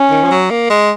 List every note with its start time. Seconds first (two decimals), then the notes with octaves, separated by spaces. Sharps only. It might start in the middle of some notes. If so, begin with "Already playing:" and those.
Already playing: C#4
0.11 D#3
0.23 F3
0.31 F#3
0.50 A#3
0.70 G#3